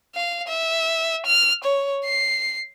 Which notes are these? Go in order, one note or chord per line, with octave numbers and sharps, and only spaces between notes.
F5
E5
F6
C#5
C7